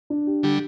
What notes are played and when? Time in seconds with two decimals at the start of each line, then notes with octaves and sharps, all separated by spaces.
0.10 D4
0.27 G4
0.43 D3 G3 G4